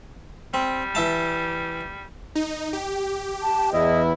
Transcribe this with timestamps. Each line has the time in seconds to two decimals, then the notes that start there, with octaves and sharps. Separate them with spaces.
0.54 G3 C4
0.95 E3 E5 A5
2.35 D#4
2.73 G4
3.43 A5
3.72 E2 E4 D#5